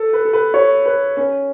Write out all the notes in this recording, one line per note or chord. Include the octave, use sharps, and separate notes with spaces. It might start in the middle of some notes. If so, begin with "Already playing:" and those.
Already playing: A4
B4
A4
B4
C#5
B4
C#4